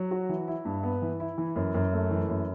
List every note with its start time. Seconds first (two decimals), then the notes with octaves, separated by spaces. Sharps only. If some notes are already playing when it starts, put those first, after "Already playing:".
Already playing: F#3
0.11 F#4
0.29 E3
0.48 E4
0.65 G2
0.83 B3
1.02 E3
1.20 E4
1.38 E3
1.56 F#2
1.74 F#2
1.93 A3
2.11 E3
2.29 F#2